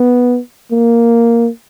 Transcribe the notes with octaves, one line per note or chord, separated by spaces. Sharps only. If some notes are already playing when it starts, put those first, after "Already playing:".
Already playing: B3
A#3